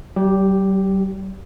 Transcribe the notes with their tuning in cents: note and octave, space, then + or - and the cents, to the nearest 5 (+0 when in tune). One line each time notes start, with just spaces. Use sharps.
G3 -40 G4 +0